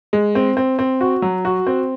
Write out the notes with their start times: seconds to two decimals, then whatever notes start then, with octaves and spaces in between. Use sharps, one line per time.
0.13 G#3
0.35 C4
0.57 C4
0.79 C4
1.01 F#4
1.22 F#3
1.45 F#4
1.67 C4